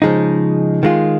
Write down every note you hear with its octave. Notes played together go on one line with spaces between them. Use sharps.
C#3 F3 G#3 D#4
D#3 G#3 F4